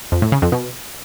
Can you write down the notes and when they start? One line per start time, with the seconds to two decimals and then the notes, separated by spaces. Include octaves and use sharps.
0.12 F2
0.22 A2
0.32 C#3
0.42 F2
0.52 B2